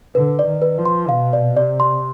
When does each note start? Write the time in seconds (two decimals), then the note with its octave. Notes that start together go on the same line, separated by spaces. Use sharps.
0.15 D3 B4
0.39 D5
0.46 D#3
0.62 B4
0.78 F3
0.86 C6
1.09 B2 F5
1.33 D5
1.56 C3 D5
1.80 C6